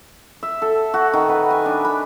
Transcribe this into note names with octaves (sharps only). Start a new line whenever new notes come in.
E5
A4
F#4
D#3
B4
G#5
D4
B5